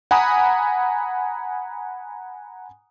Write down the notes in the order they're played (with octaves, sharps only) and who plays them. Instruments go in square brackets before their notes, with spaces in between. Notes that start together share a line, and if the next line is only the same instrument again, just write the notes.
[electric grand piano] F#5 G#5 A#5 B5 D#6